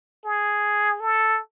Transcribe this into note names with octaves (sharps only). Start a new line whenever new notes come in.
G#4
A4